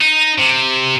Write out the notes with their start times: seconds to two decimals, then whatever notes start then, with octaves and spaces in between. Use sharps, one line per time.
0.01 D#4
0.39 C3